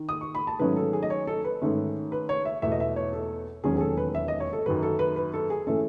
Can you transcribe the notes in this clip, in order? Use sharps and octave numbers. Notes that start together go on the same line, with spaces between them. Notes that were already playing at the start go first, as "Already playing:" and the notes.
Already playing: D#3
D#6
C#6
B5
A5
G#2 D#3 F#3 A3 C#4 B4
A4
G#4
D#5
C#5
A4
B4
G#2 D#3 A3 C#4
B4
C#5
E5
E2 B2 A3 E5
D#5
E5
C#5
A4
E1 D#2 D#3 F#3 C#4 G#4
G#4
A4
B4
E5
D#5
C#5
A4
F#2 D#3 F#3 B4
A4
B4
B4
A4
G#4
E3 A3 C#4 A4